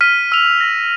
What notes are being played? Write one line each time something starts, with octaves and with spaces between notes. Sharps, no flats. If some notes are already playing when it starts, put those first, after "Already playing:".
F6 B6 D#7
E6 F7
A#6